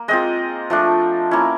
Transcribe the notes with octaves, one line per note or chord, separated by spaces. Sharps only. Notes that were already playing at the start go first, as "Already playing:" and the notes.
Already playing: A#3
G#3 C4 F4 D#5
F3 A3 D4
A#3 C#4 E4